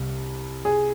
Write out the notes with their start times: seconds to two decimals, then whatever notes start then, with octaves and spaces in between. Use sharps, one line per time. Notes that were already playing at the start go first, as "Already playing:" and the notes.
Already playing: C2
0.65 G#4